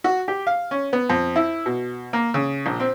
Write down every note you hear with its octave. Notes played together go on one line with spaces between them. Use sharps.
F#4
G4
F5
C#4
B3
F2
E4
B2
A#3
C#3
A#1
C4